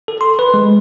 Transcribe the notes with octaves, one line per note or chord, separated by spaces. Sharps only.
A4
C6
B4
G#3